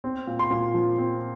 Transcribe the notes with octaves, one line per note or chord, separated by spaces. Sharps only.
C4
A#2
C6
A#2
F3
C4